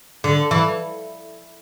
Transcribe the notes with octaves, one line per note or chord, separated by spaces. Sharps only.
D3
E3